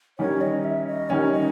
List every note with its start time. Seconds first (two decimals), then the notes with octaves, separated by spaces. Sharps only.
0.19 D#3 G3 C#4 C#5
0.41 D#5
0.64 E5
0.87 D#5
1.10 D#3 G3 C#4 C#5
1.33 D#5